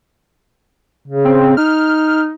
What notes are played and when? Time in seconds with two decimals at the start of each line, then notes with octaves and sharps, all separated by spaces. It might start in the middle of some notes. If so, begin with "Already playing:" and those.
1.08 C#3
1.25 C4
1.57 D#4 F6